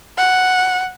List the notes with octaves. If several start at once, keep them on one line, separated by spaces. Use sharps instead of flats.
F#5